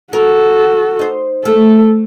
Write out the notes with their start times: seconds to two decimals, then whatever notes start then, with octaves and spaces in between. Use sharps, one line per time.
0.13 F#4 A4 A#4
0.99 D#4 C5
1.45 A3 A4